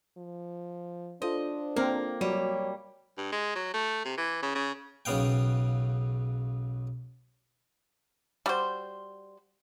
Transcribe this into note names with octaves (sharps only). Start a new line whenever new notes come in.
F3
D4 F4 A4 C5 D#5
A#3 C4 A#4
F#3 G3 C#5
G2
G#3
F#3
A3
C3
E3
C#3
C#3
B1 C#3 B3 F5 G5
G3 F#4 C5